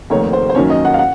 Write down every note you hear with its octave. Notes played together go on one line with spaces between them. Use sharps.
F1 D#2 D#3 A3 C#5
C5
C5
F#2 D#3 A#3 C#4 C#5
D#5
F#5
F5
F#5